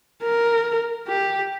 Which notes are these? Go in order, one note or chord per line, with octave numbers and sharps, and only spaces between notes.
A#4
G4